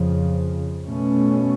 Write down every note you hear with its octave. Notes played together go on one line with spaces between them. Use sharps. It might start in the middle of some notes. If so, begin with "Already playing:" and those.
Already playing: F2 C#3 F3
B2 A3 C#4